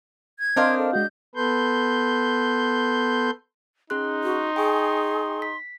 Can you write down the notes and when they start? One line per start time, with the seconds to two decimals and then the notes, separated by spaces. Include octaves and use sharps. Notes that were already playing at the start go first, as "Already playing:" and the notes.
0.40 G#6
0.56 C4 D4 A#4 C5 D#5 F5
0.77 A4
0.93 G#3 D4 F#4 D#5 G6
1.35 B3 A4 B4 C6 G6
3.90 C#4 D#4 G#4 C6 F#6
4.24 F#4
4.56 G#4 G5 G#5 C#6
5.42 B6